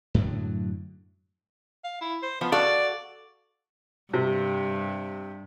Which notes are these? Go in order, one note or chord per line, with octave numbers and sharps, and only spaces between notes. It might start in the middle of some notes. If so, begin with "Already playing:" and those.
F#2 A2 D3 F#3
F5
E4
C5
F3 B3
F#4 A4 D5 F5
G2 C3